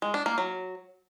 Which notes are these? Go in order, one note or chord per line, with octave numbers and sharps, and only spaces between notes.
G#3
D4
A#3
F#3